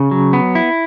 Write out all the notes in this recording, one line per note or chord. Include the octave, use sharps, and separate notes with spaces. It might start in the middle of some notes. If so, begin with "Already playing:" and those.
Already playing: C#3
F#3
B3
E4